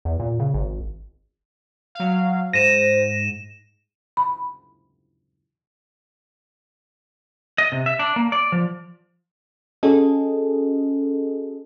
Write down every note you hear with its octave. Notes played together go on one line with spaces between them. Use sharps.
E2
A#2
C#3
G#1
F#3 F5
G#2 C5 A#6 D#7 E7
B5
D#5
C3
E5
D4
A#3
D5
F3
C#4 F#4 G#4 A4 D#5